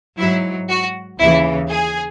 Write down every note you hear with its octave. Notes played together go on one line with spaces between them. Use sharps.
G#2 F#3 E4
F#4
D#2 C#3 E3 E4
G#4